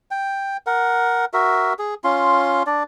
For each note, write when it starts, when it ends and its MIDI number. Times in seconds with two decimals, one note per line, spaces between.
0.11 0.57 79
0.67 1.25 70
0.67 1.25 78
1.34 1.73 66
1.34 1.73 70
1.34 1.73 76
1.79 1.94 68
2.04 2.63 61
2.04 2.63 65
2.04 2.63 84
2.66 2.83 62
2.66 2.83 74